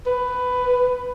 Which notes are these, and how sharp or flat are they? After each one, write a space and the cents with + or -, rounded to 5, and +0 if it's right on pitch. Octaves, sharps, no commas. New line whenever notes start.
B4 +10